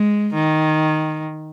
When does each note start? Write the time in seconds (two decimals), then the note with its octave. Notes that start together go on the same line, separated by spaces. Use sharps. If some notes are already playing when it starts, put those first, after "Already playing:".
Already playing: G#3
0.34 D#3